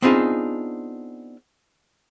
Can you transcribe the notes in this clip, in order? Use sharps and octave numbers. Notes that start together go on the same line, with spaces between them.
B3 C4 D4 D#4 F4 G#4